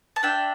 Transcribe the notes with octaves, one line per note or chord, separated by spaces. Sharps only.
A5
D4 E5 G5